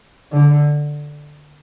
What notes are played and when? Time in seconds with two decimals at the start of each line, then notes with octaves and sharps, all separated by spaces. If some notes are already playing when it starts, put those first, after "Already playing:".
0.32 D3